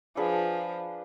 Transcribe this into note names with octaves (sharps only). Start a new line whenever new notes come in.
F3 D4 G#4 B4